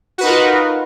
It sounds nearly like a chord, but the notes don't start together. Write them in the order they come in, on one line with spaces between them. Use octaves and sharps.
F#4 B4 D#4 A#4 F4